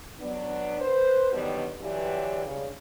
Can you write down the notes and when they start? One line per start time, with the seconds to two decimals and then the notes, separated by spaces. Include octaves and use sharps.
0.20 F#3 B3 D4
0.80 B4 C5
1.32 B2 D3 D#3 F#3 G3 B3
1.80 G2 D3 E3 F#3 C#4 G4
2.45 G2 C#3